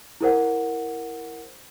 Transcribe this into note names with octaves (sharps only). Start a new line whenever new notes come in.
E4 G#4 A#4 C5 F#5